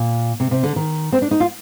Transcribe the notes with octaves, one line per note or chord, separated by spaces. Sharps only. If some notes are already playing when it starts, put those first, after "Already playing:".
Already playing: A#2
C3
C3
D3
D#3
C4
D4
D#4
F4